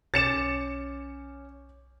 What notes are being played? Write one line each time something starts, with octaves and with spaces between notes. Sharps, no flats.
B1 C#4 D6 A6 C#7 E7